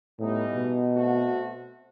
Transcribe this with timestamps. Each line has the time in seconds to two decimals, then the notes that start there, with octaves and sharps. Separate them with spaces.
0.19 A2 E3 G3 B3 D#4
0.55 B2
0.93 A3 C4 F#4